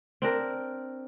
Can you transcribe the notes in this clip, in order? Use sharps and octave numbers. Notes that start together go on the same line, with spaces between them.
C4 D4 A#4